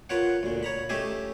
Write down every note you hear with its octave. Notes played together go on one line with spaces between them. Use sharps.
F4 A#4 B4 C#5 F#5
D2 A#2
C#5 A#5 B5
A3 C#4 G4 D#5 E5 G#5